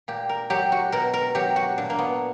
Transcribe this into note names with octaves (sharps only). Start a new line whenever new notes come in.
A#2 G4
A#4
F#3 G4
F#4
B2 A#4
A#4
F#3 G4
F#4
A#2 D4
A#3
B3